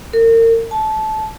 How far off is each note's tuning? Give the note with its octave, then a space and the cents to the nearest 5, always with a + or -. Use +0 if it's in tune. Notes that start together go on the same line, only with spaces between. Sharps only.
A#4 -35
A5 -20